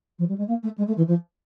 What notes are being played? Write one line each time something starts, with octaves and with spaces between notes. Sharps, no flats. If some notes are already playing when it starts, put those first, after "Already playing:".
F3
G3
G#3
A#3
A3
G#3
A3
E3
F3